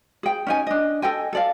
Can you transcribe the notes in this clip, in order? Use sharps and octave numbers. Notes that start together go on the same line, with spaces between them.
G#4 G5
C#4 D#4 G#5
D4 D#5
A4 D#5 G5 G#5
A4 D5 F5